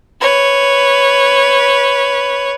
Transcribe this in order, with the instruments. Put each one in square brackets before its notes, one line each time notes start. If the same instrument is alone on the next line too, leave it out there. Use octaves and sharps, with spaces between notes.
[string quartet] B4 C#5